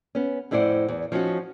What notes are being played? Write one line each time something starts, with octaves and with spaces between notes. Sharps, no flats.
B3 C#4
F2 A2 E4 C5 D5 F#5
E2
F3 C#4 D#4 F#4